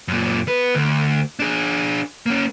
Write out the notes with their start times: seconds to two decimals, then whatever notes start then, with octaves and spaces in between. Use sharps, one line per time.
0.08 F#2 A#2
0.48 B3 B4
0.75 D2
1.39 D4 G#4
2.26 A#3 C#4